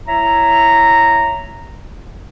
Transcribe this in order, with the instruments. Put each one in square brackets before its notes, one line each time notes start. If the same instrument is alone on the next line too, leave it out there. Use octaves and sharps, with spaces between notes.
[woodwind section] E4 C#5 E5 A#5